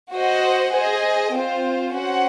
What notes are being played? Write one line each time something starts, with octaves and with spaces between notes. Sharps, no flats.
F#4 C5 D#5 F#5
G#4 C5 D#5
C4 F4 C5
C#4 F#4 C5 F#5